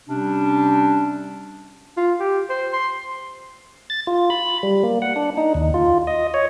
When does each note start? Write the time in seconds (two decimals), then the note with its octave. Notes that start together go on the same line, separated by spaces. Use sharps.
0.09 C3 G3 C#4 D4
1.97 F4
2.20 G4
2.50 C5
2.73 C6
3.90 A6
4.07 F4
4.30 B5
4.63 G3
4.83 A#3
5.02 F#5
5.16 D4
5.37 D#4
5.54 D#2
5.74 F4
6.07 D#5
6.34 C#5